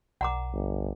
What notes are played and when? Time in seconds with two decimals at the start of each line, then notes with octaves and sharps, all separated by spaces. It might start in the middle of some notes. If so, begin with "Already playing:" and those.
0.21 B1 F#5 A#5 D6
0.53 G1